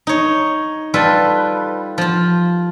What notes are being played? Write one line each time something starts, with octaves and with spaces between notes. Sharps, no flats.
D#4 C#5
G3 F4 A4 B4
F3 F4